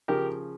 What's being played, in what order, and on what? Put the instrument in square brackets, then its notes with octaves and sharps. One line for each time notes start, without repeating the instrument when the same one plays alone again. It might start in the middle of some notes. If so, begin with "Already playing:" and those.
[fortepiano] C#3 F3 G4 A#4